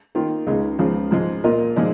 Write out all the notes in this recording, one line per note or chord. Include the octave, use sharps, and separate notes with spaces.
D#3 A#3 F4
C#2 C#3 G#3 D#4
C#2 C#3 F3
G#2 F3 G#3
A#2 A#3 F4 A#4 D#5
A#2 F3 G#3 D#4 G#4